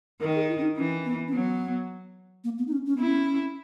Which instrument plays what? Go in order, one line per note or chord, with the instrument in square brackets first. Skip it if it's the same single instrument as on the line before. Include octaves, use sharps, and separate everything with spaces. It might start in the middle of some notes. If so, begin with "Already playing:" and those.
[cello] D#3 [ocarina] A#4
[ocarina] G#4
E4
C#4
D#4
[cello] E3 [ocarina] C#4
[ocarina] B3
C#4
[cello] F#3 [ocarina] B3
[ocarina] A#3
B3
D#4
C#4
C#4
[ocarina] B3 [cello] E4
[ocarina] C#4